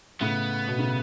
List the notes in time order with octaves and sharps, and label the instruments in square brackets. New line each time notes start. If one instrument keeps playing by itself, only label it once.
[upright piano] A2 C#3 [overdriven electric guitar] B3
[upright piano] B2
C#3